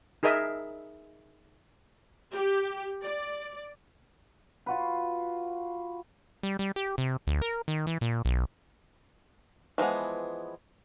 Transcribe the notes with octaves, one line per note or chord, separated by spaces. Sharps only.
D#4 G#4 A#4 D#5 E5
G4
D5
F4 F#4 B4
G3
G3
G4
C3
D2
A#4
D#3
E3
A#2
B1
E3 F3 G#3 B3